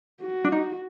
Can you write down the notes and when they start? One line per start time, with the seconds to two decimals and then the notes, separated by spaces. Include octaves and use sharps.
0.22 F#4
0.44 D4
0.52 D#4